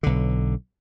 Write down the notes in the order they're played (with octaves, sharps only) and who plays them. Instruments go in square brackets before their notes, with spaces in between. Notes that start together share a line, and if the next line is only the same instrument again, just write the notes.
[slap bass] B1 D3